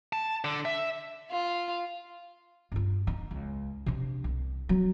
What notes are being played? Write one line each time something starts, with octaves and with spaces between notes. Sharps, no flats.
A5
D3
E5
F4
G2 F4
D#4
C#2
C3 D4
C2
F#3